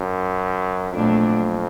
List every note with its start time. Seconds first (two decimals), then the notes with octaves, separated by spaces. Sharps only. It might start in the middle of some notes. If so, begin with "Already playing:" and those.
Already playing: F#2
0.93 F2 A#2 F#3 A3 D4